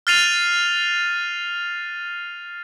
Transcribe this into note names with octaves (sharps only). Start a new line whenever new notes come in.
F6 F#6 A6 C7 D#7 F7